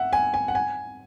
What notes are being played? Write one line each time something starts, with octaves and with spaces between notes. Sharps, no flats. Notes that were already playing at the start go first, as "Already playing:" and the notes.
Already playing: E5 F#5
G#5
G#5
F#5
G#5